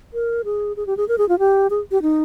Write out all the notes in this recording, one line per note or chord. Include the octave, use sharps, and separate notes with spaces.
A#4
G#4
G#4
G4
G#4
A#4
G#4
F4
G4
G#4
G4
D#4